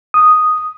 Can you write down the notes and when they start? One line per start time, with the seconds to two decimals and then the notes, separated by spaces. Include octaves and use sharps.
0.14 D#6